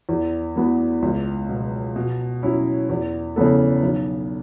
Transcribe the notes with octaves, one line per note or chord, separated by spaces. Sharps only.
E2
E3 B3 F#4
C#2
B2 F#3
B2
F#3 C#4 E4 C#5
E2
C#3 E3 B3 A4
B1